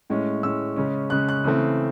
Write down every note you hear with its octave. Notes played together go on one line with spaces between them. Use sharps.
A2 G#3 C#4
A2 G#3 C#4 E6
C#3 G#3 C#4
C#3 G#3 C#4 F#6
F#6
C#3 E3 A3 C4